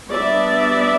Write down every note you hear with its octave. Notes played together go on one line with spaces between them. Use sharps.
G3 B3 D4 D5 E5